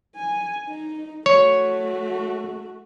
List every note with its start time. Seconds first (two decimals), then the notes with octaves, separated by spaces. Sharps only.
0.16 G#5
0.68 D#4
1.26 A3 F#4 C#5